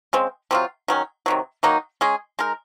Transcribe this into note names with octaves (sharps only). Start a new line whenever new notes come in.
C#3 G#3 C4
C3 F#3 C4 F4
D#3 F#3 C#4
C3 D#3 F#3
D#3 F#3 A#3 D#4
G#3 C#4 G#4
G#3 D#4 A#4